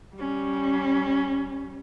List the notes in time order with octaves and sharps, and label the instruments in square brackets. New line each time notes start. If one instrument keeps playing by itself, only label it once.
[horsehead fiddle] G3 C#4